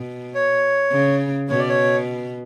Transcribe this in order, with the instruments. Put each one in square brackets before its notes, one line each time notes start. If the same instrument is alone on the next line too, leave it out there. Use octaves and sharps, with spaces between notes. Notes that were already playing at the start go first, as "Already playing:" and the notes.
Already playing: [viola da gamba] B2
[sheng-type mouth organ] C#5
[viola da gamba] C#3
[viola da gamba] B2 [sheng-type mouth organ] C#5
[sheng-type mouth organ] D5
C#5